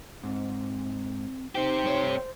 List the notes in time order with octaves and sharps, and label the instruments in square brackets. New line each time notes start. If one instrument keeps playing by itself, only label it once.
[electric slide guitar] G#2 [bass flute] C4
[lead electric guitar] C4 G4 [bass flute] D#4 [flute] C5
[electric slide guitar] G2 A3 C#5